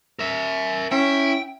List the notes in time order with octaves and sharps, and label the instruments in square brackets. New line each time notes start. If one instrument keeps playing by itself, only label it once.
[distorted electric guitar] A#4 E5
[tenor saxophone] C#4 [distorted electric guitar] E4 [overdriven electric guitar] G5